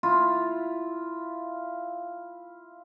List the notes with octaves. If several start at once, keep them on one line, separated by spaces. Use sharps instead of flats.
E4 F4